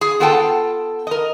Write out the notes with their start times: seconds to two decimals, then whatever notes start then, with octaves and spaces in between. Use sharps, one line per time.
0.01 G#4
0.20 B3 F4 A4 F#5 G5 A5
1.07 A#4 D#5